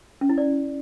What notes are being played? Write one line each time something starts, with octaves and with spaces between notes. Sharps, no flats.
C#4
E4
D5